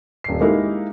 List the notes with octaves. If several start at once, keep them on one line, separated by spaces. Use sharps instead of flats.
D#1 C7
G#3 A#3 D#4 E4 G4 A#4